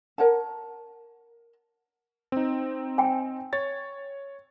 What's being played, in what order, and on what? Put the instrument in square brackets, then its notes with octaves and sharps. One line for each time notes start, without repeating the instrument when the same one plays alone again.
[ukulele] A#4 C#5 F#5 A5
[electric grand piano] C4 D#4
[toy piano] G5 G#5
[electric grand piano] C#5 A6